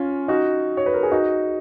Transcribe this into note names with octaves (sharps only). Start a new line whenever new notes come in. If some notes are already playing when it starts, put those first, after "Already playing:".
Already playing: C#4 F4
D#4 F#4
C#5
B4
A#4
G#4
D#4 F#4